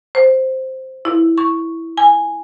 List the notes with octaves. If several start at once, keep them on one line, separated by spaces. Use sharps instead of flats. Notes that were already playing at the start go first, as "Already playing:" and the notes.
C5
E4
C#6
G#5